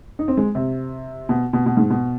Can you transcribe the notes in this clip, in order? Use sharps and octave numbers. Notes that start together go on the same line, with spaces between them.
D#4
C4
G#3
C3
B2
B2
B2
G#2
B2